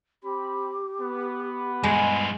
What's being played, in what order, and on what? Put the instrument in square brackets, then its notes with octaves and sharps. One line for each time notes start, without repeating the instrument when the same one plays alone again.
[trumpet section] C4 B5 [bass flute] G4
[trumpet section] B3
[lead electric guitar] G2 G#4 [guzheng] G#3